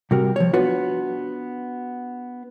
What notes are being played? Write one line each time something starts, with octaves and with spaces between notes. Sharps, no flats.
C3 G3 F#4 A#4
F3 C#5
B3 D4 F4 F#4 B4